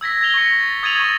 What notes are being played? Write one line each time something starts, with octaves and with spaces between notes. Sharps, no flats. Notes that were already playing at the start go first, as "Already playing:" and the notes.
E6 G#6 A#6 B6
G#6 A#6 B6 F7 G7
C#6 A#6 C#7
A6
D#6 G#6 A6 D#7 F7 F#7
C#6 A6